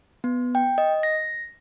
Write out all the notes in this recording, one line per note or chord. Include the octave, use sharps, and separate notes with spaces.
B3
G5
D#5
A#6